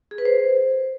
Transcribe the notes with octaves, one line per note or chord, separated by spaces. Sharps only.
G#4
B4
C5